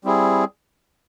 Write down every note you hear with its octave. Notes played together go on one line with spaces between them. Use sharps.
G3 C4 E4 G#4